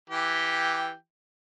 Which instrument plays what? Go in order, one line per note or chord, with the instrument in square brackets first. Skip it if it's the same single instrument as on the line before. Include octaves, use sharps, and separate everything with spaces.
[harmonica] E3 G4 G5